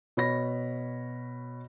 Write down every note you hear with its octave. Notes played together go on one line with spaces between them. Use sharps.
B2 C#5 B5 A#6